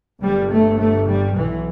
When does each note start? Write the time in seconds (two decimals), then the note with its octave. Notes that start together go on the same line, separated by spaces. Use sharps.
0.23 G1 G2 G3
0.51 A3
0.79 A3
1.09 G3
1.37 B1 B2 E3